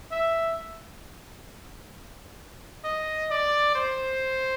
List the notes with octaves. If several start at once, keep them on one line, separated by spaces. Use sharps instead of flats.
E5
D#5
D5
C5